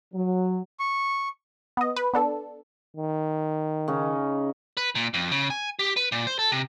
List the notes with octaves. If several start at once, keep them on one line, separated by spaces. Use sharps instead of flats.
F#3
C#6
B3 D#5
B4
B3 D4 A4
D#3
C#3 C#4 D#4
B4
A#2
F2
C#3
G#5
G4
B4
A#2
C5
A4
C3